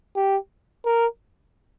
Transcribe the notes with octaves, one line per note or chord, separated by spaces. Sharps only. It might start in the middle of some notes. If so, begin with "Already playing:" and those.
G4
A#4